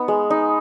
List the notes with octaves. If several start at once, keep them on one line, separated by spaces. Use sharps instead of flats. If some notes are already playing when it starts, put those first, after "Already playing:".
Already playing: B3 D#4
G#3
D#4